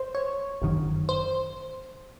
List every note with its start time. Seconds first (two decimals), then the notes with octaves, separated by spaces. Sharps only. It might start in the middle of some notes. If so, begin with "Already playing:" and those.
Already playing: C5
0.15 C#5
0.62 G1 F#2 D#3
1.09 C5